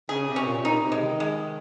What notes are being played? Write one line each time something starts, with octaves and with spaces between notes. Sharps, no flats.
C#3 G#4
C3
C#4
A#2
C3
A#2 D#4
C3
G#3
D#3
G#3